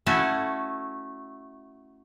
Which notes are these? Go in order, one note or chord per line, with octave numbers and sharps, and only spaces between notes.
A3 C#4 E4 F#4